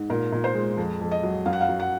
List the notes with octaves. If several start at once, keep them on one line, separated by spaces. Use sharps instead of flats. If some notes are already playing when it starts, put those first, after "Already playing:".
Already playing: G#2
A#2 A#4
A#2
C5
G#3
F2
F2
D#5
F#3
F#2 F5
F#5
F5
F#3
F#5